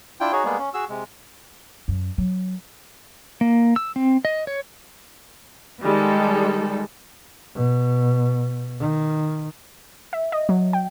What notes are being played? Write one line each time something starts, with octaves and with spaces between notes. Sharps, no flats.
D4 E4 F4 G5
D#4 F#4 G#4 C#5
G3 G#3 A#3 B3 G#4
C#4
F#4 G#4 E6
C3 G#3
F#2
F#3
A#3
E6
C4
D#5
C#5
D#3 G3 G#3 A4
B2
D#3
E5
D#5
F#3
G5